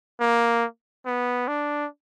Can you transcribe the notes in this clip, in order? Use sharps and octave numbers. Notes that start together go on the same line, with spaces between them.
A#3
B3
D4